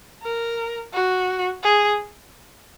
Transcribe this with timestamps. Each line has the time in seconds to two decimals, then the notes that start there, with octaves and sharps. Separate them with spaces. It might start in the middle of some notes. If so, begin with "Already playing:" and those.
0.23 A#4
0.93 F#4
1.63 G#4